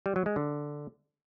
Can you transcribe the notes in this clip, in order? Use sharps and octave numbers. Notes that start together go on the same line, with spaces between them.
G3
F#3
G#3
D3